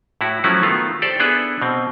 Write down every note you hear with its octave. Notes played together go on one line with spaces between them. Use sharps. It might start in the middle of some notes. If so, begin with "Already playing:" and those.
A2 E4 F#4
F3 F#3 A3 C#4 E4 F#4
D#3 A3 B3 F4
G4 A4 C5 D5
B3 D4 E4 G#4 A4 B4
B2 C4